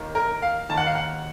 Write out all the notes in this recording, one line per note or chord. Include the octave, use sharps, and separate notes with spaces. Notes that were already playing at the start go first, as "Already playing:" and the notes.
Already playing: D#2 D#3 A#3
A#4
F5
D#2 D#3 A#3 A5
F#5
F5
F#5